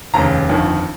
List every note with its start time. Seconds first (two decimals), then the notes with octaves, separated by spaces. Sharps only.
0.14 F1 D#2 C#3 A#5
0.49 G1 F2 D#3